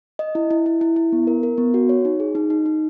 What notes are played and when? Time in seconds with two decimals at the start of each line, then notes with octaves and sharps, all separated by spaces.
0.19 D#5
0.35 E4
0.51 E4
0.66 E4
0.81 E4
0.96 E4
1.12 B3
1.27 A#4
1.43 A#4
1.58 B3
1.74 F#4
1.89 C#5
2.05 D#4
2.20 G#4
2.35 D#4
2.50 D#4
2.66 D#4